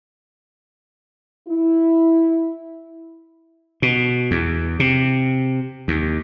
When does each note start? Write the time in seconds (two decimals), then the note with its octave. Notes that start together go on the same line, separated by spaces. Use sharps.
1.48 E4
3.82 B2
4.31 E2
4.80 C3
5.88 D#2